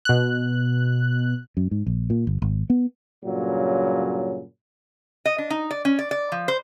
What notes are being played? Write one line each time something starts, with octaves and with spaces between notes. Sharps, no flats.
B2 F#6
F#2
G#2
A#1
A#2
G1
G#1
B3
G2 A#2 C#3 F#3
D#5
D4
D#4
D5
C#4
D5
D5
F3
C5